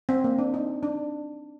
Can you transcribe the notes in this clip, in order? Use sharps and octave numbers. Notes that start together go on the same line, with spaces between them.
C4
A#3
D4
D#4
D4